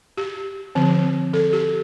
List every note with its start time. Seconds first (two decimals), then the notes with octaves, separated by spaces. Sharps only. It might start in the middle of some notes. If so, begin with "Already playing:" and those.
0.17 G4
0.75 D3 F3 C4
1.33 A4
1.53 G4